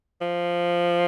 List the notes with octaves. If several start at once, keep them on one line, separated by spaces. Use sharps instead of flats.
F3